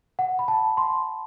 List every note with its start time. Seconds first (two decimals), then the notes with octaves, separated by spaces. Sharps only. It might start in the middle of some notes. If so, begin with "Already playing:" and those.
0.19 F#5
0.39 B5
0.48 A5
0.77 C6